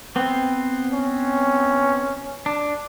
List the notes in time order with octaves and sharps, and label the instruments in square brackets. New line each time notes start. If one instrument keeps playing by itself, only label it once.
[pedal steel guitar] B3 C4
[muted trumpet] C#4
[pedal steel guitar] D4